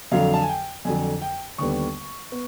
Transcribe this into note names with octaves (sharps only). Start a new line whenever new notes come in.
F2 D3 F#3 F5
A5
G#5
G5
F2 D3 F#3 G#5
G5
D#2 D3 G3 B3 C#6
B3